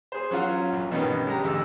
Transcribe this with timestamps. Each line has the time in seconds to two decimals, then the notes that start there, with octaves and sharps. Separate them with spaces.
0.12 G#4 C5
0.31 F#3 C#4 F4 F#5
0.72 A#1
0.91 G2 B2 D#3 B3 C#4 D#4
1.27 G#3 G4 A#5
1.44 A1 D2 E6